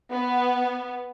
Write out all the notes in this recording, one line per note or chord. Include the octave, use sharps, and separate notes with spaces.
B3